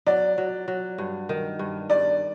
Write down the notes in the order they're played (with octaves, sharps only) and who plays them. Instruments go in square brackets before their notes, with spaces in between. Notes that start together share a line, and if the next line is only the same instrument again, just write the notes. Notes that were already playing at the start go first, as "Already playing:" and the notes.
[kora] F#3 [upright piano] D5
[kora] F#3
F#3
G2
D#3
G2
[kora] G2 [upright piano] D5